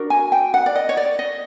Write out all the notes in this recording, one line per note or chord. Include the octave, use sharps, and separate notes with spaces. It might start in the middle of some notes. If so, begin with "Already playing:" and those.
Already playing: D4 F#4 A#4
G#5
G5
F#5
D5
D#5
C#5
D5
D#5